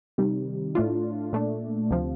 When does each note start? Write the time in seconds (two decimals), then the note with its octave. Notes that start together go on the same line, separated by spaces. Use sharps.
0.18 C3 D#3 G3
0.75 A2 A3 D4 F4
1.33 A#2 A3 D4
1.90 D2 C3 F3